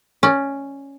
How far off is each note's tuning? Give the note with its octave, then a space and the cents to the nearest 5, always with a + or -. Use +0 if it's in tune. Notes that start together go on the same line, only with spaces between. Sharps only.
C#4 +0 D5 +25